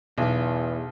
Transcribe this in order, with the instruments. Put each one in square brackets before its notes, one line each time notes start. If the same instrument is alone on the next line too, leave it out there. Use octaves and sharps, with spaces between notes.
[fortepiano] B1 [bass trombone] E2